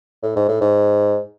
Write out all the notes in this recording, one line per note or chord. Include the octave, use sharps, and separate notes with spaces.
A2
G#2
A2
G#2